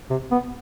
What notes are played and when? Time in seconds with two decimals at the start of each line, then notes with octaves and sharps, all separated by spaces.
0.10 C3
0.31 B3